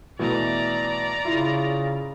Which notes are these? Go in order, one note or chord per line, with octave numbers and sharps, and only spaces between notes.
B2 E3 A3 D5 A#5
C#3 E4 F4